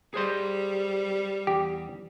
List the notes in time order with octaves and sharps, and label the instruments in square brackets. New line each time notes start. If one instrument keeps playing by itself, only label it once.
[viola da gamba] G3 [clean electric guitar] G#4 C5 C6
[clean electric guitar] E2 [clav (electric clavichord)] G4